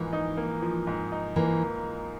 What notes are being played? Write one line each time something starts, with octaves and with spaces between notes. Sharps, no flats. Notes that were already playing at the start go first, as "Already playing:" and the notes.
Already playing: G#2 E3 F3 A#3
D#4
A#3
F3
G#2
D#4
E3 A#3